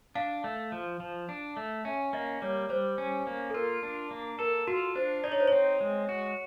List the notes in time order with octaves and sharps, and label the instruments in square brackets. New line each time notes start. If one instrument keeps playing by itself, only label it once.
[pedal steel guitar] D4 [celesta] F5
[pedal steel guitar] A3
F3
F3
D4
A3
[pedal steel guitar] C#4 [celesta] E5
[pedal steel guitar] A#3 [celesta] D#5
[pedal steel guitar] G3 [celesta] C#5
[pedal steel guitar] G3 [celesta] C5
[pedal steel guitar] C#4
A#3
[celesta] A4
[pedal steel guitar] F4 [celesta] A#4
[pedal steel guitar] D4
A#3
[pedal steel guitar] A4 [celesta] A#4
[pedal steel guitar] F4 [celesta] F#4
[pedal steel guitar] D4 [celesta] C5
[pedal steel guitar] D#4 [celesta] D5
[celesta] C#5
C5
[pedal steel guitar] C4 [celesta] C#5
[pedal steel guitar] G#3
F#4